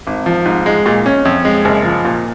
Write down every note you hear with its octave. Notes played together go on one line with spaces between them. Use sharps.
G#1
F3
G#2
G#3
A#2
C#4
F2
G#3
F#1
F3
A#2